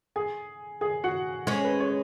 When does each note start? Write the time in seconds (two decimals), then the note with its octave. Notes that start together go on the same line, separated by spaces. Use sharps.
0.16 G#4 G#5
0.81 G#4 G#5
1.04 F#4 F#5
1.47 G#3 C#4 C#5
1.64 B4
1.80 C#5